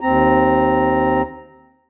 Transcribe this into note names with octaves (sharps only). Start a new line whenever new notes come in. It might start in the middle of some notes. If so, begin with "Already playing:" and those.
D#2 C4 A#5